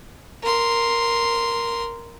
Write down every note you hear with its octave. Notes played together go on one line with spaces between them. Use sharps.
A#4 C6